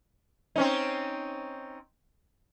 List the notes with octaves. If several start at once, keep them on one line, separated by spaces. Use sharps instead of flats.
C4 C#4 D#4